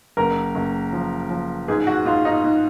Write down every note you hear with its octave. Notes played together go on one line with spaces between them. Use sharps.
F#1 A#4
F#1
F3
F3
G#2 G#4
F#4
G#2 F4
D#4
G#2